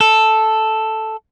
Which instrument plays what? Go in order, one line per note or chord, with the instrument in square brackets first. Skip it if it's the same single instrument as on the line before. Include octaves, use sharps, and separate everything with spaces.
[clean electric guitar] A4